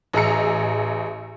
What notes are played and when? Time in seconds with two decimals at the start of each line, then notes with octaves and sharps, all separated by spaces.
0.13 A1 G#4 D#5 A#5 E6 C#7